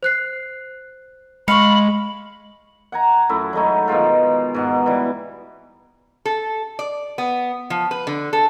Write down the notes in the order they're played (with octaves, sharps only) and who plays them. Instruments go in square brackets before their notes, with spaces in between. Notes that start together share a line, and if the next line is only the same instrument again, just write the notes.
[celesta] C5 F#6 C7
[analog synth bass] G#3 [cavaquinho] F5 C#6 [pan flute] B5 [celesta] C#7
[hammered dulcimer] F#5 G#5 A#5
F#2 A3 E4
F#3 G#3 A3 D#4
B2 D#3 G#3 F4
G#2 B2 F#5
E3 G3
[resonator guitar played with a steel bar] A4
D5
B3
F3
B4
D3
A4